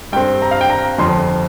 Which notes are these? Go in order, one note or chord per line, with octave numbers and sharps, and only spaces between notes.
G2 G3 C4 G5
A#5
F5
G5
A#5
G1 F2 F3 C6